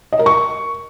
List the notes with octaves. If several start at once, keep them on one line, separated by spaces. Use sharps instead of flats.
D#5
A#4
C#6